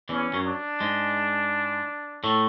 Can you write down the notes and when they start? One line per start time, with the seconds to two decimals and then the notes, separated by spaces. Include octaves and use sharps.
0.09 E2 E3 C#4
0.34 F#2 F#3
0.45 D4
0.80 G#2 G#3
2.24 A2 A3